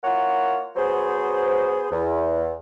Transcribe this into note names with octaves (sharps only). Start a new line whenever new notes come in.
A#3 E4 F4 A#4 C#5 F#5
F#3 B3 G#4 C5
E2